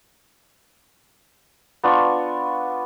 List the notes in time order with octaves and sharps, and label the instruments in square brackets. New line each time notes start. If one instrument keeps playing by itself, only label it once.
[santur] B3 D4 F4 C#6